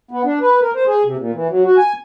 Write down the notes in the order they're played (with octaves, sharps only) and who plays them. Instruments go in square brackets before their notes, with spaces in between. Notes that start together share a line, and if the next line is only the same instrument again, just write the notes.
[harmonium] B3
D4
B4
A#4
C5
G#4
C3
A#2
E3
F#3
F#4
G#5